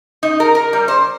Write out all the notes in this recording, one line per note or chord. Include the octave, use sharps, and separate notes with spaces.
D#4
A#4
A#4
G3
C5